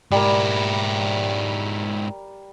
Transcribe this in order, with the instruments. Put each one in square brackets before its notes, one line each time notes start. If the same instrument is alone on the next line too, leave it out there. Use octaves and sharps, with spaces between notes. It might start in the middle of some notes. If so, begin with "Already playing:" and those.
[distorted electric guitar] G#2 E4 [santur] G3 A#4